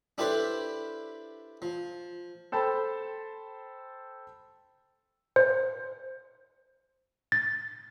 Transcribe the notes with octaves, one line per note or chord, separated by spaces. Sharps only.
D4 E4 G4 A4 B4 C5
F3
A4 C5 G5 A5 B5
C5
A6